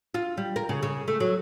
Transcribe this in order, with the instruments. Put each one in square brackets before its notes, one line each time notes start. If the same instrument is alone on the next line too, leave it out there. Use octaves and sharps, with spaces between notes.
[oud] F4
G3
A#4
C#3
C#3
A3
F#3